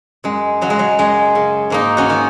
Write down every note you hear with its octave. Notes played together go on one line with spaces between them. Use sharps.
F#2 G#3
C#3 F#3
G#3
F#3
F#2 G#3
C#3
G#2 A#3 D#4
C#4 F#4
D#3